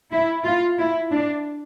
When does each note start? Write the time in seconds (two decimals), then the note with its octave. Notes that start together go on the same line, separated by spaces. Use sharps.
0.12 E4
0.45 F4
0.79 E4
1.12 D4